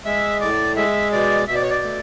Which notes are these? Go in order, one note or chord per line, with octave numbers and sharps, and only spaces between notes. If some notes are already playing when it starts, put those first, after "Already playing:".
G#3 E5
A2 D5
G#3 E5
B2 D5
B2 E5
D5
C#5
D5
A3